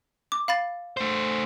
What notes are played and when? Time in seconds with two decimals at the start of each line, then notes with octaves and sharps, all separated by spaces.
0.32 D6
0.48 F5 B5 A6
0.97 A3 C5